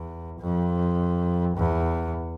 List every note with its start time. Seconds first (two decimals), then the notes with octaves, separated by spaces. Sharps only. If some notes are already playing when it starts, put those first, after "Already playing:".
Already playing: E2
0.40 F2
1.57 E2